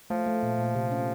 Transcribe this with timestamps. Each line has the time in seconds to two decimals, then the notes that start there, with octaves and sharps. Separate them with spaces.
0.10 F3 A3
0.26 A3
0.43 A#2
0.58 A#2
0.75 C3
0.91 C#4